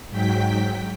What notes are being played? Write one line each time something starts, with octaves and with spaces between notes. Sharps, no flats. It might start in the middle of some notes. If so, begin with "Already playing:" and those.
G#2 F#3 G5 B6